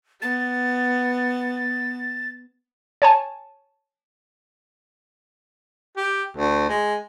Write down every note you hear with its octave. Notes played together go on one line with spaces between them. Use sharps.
B3 A6
C#5 G#5 A5
G4
D2
G#3